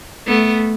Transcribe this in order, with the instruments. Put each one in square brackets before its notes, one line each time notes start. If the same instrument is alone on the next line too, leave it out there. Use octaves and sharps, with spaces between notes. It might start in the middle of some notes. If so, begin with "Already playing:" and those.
[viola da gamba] A3 B3